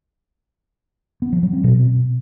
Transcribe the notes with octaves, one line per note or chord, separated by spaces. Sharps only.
B3
F3
F#3
C4
B2